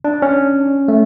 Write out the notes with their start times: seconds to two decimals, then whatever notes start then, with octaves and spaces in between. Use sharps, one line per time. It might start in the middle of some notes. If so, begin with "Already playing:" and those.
0.04 D4
0.22 C#4
0.88 A3